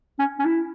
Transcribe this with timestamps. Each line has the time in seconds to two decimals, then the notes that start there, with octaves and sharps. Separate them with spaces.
0.19 C#4
0.39 C#4
0.45 E4